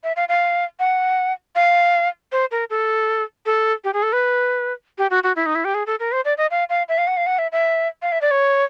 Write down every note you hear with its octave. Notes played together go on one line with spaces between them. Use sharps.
E5
F5
F5
F#5
F5
C5
A#4
A4
A4
G4
G#4
A4
B4
G4
F#4
F#4
E4
D#4
E4
G4
G#4
A4
A#4
C5
D5
D#5
F5
F5
E5
F5
F#5
F5
F#5
E5
E5
F5
E5
D5
C#5